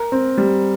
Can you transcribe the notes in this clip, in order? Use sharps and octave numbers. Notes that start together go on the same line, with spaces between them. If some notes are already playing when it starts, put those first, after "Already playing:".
Already playing: A#4
C4
G3